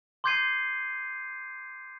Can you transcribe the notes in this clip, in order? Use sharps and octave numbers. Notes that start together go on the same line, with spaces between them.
C6 D6 G6 G#6 C7 D#7